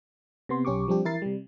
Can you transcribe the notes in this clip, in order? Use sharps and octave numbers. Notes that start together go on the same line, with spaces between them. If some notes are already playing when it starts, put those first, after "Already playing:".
C3 B3 C6
B1 C#4 G4 C#6 D6
F3 G3 C4 D4 G4
E3 E4 A#4 A6 C7
C3 G3